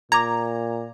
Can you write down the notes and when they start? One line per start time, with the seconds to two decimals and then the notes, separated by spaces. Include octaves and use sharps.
0.12 A#2 A#5 D6 G#6